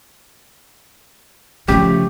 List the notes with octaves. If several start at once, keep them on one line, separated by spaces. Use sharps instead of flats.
C#3 F3 A3 G4